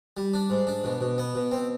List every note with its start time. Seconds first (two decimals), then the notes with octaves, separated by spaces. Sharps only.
0.17 G3
0.33 D4
0.50 G#2
0.67 D4
0.84 B2
1.01 B2
1.18 B3
1.35 B2
1.52 C4